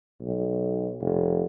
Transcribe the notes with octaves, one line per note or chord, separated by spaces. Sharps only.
B1
F1